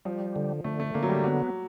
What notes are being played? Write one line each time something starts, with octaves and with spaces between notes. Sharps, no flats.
F3 G3
D3
D3 A3
A3
D3 A#3
F#3
G3
F#3 B3